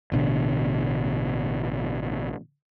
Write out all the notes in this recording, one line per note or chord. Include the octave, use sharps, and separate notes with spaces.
A1 B2 D3